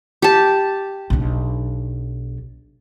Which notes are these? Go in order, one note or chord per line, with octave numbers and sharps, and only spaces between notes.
G4 A5
B1 D4